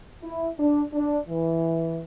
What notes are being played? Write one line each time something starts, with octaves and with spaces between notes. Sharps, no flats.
E4
D4
D4
E3